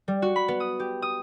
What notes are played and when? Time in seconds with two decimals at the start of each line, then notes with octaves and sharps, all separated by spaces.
0.08 G3
0.22 F#4
0.36 B5
0.48 B3
0.60 D#6
0.80 G4
1.02 D#6